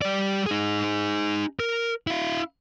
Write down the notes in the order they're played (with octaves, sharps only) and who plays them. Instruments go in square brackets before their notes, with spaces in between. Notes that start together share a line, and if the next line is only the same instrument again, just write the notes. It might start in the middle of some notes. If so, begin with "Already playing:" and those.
[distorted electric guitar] G3 D5
D#4 G#4
A#4
E4 F5